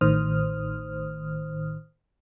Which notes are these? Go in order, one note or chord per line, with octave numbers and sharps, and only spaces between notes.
A1 A2 D#3 C5 D#6 F6